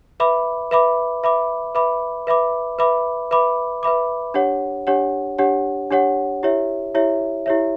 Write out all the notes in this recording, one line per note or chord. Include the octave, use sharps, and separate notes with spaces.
B4 E5 B5 D6
B4 E5 B5 D6
B4 E5 B5 D6
B4 E5 B5 D6
B4 E5 B5 D6
B4 E5 B5 D6
B4 E5 B5 D6
B4 E5 B5 D6
D4 G4 C#5 F#5
D4 G4 C#5 F#5
D4 G4 C#5 F#5
D4 G4 C#5 F#5
E4 G4 C#5 E5
E4 G4 C#5 E5
E4 G4 C#5 E5